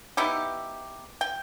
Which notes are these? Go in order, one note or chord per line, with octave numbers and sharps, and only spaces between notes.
B3 D#4 E4 G4
G5